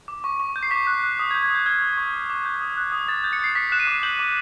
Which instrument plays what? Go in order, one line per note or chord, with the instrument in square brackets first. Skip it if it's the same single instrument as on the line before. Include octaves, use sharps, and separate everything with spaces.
[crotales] D6
C#6
C#6
G6
C7
D6 B6
F#6
F#6
D#6
G#6
G6
G#6
D#6 G6
F6 G#6
C#6
C#6
D6
D6
G6
D#6
F#6
D#6
D6 A6
G6
C#7
G6 C7
D6 B6
F#6 E7
D#7
D6
G6 F#7
D6